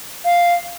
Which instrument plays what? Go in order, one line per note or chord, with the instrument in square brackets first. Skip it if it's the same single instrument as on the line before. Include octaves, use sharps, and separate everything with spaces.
[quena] F5